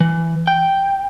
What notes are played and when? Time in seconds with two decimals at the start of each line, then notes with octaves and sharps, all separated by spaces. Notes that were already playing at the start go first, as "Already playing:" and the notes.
0.01 E3
0.47 G5